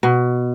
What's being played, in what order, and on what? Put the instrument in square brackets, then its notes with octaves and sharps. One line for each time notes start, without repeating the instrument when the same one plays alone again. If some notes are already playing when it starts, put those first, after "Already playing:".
[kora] B2